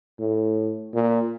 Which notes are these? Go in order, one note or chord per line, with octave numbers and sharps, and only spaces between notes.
A2
A#2